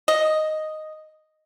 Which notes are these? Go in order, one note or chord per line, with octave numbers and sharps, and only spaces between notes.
D#5